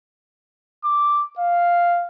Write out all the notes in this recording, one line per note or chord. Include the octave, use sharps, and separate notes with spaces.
D6
F5